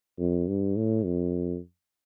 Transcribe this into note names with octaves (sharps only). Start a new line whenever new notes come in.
F2
G2
A2
F2